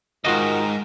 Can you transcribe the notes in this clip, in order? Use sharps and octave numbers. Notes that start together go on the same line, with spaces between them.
E2 G#2 D#3 F4 F#4 A#4 D#5